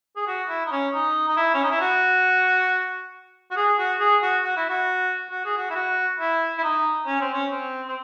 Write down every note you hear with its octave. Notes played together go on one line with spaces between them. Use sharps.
G#4
F#4
E4
D#4
C#4
D#4
D#4
E4
C#4
D#4
E4
F#4
F#4
G#4
F#4
G#4
F#4
F#4
E4
F#4
F#4
G#4
F#4
E4
F#4
E4
E4
D#4
C#4
C4
C#4
C4
C4